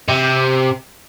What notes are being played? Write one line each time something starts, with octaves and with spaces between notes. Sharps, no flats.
C3